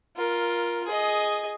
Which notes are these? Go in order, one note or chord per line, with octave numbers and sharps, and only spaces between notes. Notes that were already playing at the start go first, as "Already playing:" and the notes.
F4 A#4
G#4 D#5